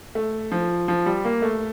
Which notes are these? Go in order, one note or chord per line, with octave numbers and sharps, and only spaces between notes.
A3
F3
F3
G3
A#3
A3